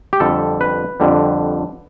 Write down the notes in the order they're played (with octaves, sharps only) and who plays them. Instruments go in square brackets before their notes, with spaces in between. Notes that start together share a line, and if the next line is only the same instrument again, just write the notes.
[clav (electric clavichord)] G4
F2 D3 G3 A4
B4
F2 D3 G3